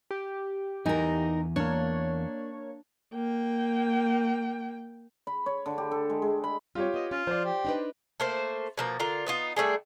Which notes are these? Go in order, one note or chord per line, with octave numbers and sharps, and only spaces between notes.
G4
E2 D#4 A#4 G#5
A#3 D4 C#5
A#3 G5
B5
C#5
D3
G4
A4
G#3
G#3
B5
G3 C4 F4 G4 C#5
B3 D#5
C#4 F4
F3 C5 D5
G4
D4 D#4 B4
A3 A#3 C5
B2 F3 A#3
D3 F4 A#4
B3 D#4 F4
G3 A3 D4 G#4